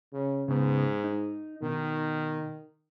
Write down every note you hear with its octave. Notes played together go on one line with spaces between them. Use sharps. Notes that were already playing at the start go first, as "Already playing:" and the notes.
C#3
G#2 C#3 B3
D#4
B2 D#3 D#4